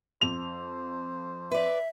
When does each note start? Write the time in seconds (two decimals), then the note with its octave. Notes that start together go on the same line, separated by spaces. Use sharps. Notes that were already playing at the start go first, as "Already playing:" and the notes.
0.21 F2 C5 F7
1.51 B4 D5 E5